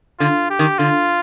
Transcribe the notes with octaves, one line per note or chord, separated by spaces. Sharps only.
D3 F4
G4
D#3
D3 F4